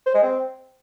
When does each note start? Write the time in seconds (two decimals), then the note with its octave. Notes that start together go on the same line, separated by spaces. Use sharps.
0.07 C5
0.15 G#3
0.23 C4